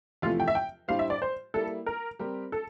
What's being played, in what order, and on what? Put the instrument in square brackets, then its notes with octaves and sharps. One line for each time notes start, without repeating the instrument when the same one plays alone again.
[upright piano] E2 C3 F3 A3 [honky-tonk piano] F4
[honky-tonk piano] G5
E5
G5
[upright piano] A2 G3 D4 G4 C5 [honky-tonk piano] F5
[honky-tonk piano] E5
D5
C5
[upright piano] G3 A#3 E4 [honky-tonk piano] A4
[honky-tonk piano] A#4
[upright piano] G3 C4 G4 A#4
[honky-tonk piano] A4